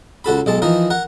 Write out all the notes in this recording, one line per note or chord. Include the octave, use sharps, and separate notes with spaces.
C#2 F#4 A4 B5
B1 G#3 A5
E3 F3 D#4 A#4
A#4 F#5